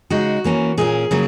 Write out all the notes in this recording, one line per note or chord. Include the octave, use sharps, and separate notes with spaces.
C#3 G#3 D#4 F#4
E3 A#3 C#4
A#2 A#3 C#4 G#4
C#3 F#3 A#3